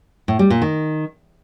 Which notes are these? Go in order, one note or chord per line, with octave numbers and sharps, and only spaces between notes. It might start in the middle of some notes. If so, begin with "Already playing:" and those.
A2
G3
A#2
D#3